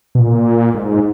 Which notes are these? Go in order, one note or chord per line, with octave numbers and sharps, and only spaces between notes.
B2
A#2
G#2